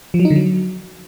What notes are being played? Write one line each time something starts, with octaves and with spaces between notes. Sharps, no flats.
F3
F#3
D#4
D3
F#3